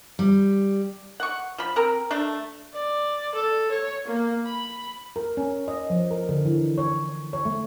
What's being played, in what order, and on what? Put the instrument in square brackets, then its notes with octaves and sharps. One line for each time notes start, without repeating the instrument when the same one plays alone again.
[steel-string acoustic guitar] G3
[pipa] F#5 C#6
F3 B5
C4 A#4
A3 D4
[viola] D5
A4
C#5
A#3
B5
[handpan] A#4
C#4
D#5
F3
A#4
D3
E3
C#5
C#5
A3